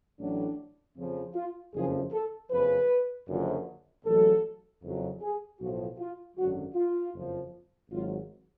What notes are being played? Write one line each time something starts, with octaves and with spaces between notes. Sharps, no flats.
A1 A2 F#3 D4
F2 C#3 F3
F4
F#1 F2 F3 G#4
A4
F#1 F2 C#3 F3 B4
F#1 F#2 D3 F3
A1 G#2 F#3 A4
F#1 F2 C#3 F#3
G#4
B1 A2 F3 F#4
F4
G#1 F#2 D3 F#3 F#4
F4
F#1 F2 F3
G#1 G#2 F#3 F4